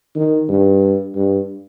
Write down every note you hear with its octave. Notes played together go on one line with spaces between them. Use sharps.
D#3
G2
G2